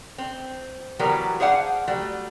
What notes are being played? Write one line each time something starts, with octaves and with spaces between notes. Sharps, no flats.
C4
E3 F#3 G3 B3 G4 A#4
G#4 C5 D5 F5 F#5 A5
F#3 G3 A3